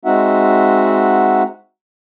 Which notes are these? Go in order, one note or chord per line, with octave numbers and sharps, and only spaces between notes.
G#3 C4 D#4 F#4 E5 F#5